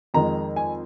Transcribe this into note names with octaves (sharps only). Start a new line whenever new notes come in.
F2 D#3 G#3 A#5
G#5